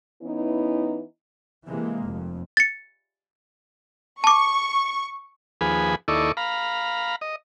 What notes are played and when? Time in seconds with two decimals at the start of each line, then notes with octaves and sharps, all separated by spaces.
0.22 E3 B3 C#4 D#4 E4
1.68 C3 E3 G#3 A#3
2.04 F1 F2
2.57 A6 C#7
4.24 A5 C#6 D6
5.61 D#2 F3 G#4 B4 G#5 B5
6.08 D#2 E4 A4 D5 D#5 C#6
6.37 F5 A#5 B5
7.21 D#5